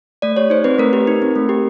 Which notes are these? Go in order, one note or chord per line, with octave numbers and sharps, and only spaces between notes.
A3 D5
G4 C#5
D#4 C5
C4 B4
A3 A#4
G4
D#4
C4
A3
G4